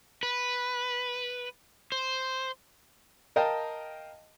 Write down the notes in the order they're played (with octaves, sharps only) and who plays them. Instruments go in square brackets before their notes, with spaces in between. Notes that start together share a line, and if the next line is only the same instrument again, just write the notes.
[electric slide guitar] B4
C5
[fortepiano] A#4 D#5 F5 G5 A5